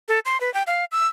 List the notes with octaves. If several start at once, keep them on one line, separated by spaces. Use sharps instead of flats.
A4
C6
B4
G5
F5
E6